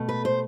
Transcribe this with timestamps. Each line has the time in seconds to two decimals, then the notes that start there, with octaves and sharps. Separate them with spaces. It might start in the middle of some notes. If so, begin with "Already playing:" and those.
Already playing: B2 A3
0.09 B4
0.25 C5